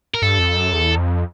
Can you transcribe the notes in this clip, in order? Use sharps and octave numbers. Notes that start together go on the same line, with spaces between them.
A#4
G2 A4
F2
F#2
E2
F2